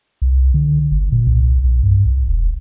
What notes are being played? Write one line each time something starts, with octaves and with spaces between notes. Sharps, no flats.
C2
D3
G1
A#2
C2
B1
G2
C2
E1